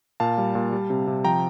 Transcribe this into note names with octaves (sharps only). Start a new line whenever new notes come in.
A#2 F5 A5
G3
A#2
G3
C3
C3
F3 G5 A#5